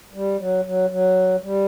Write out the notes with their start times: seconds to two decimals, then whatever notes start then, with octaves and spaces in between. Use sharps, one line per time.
0.14 G3
0.39 F#3
0.65 F#3
0.90 F#3
1.42 G3